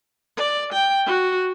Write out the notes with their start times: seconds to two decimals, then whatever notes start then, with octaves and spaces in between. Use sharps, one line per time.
0.37 D5
0.73 G5
1.06 F#4